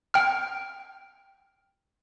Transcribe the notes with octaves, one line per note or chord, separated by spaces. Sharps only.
G5 F6